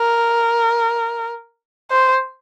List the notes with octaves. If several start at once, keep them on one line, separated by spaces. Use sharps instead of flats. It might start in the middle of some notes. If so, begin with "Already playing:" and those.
Already playing: A#4
C5